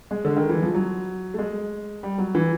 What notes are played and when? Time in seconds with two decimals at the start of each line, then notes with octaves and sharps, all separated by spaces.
0.11 G#3
0.25 D3
0.37 D#3
0.49 E3
0.62 F3
0.75 F#3
1.34 A3
1.39 G#3
2.03 G3
2.18 F#3
2.35 E3